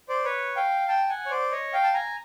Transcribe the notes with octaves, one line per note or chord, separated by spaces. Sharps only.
C5 D5
B4 C#5
F5 G5
G5 A5
F#5 G#5
C#5
C5 D5
C#5 D#5
F5 G5
A5
G#5 A#5